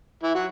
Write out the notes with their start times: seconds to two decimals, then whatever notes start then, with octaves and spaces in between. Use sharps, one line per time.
0.23 E3 E4
0.35 F#3 F#4